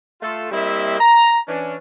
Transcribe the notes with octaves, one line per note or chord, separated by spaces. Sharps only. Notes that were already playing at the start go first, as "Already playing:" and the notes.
A3 F4 A4
G3 A#3 C4 E4 D#5 E5
A#5
E3 C#4 D4